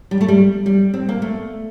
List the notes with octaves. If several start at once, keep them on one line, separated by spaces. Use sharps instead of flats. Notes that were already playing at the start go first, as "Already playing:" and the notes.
G3
A3
G3
G3
C4
A#3
A3